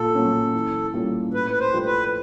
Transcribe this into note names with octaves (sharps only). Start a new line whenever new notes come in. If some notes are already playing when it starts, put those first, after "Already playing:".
Already playing: A#2 A4
F#3 A#3 C#4
E3
G3 A#3 C#4 F4
A2 B4
B4
C5
F3 A3 D4 G4
B4